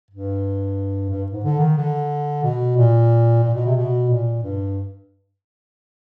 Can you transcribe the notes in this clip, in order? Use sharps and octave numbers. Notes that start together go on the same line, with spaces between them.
G2
G2
G#2
D3
D#3
D3
B2
A#2
A#2
B2
C3
B2
A#2
G2